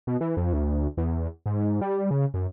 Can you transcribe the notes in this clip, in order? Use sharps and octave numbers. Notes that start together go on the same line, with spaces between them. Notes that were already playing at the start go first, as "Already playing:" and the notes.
B2
E3
F2
D2
E2
G#2
G3
C#3
F#2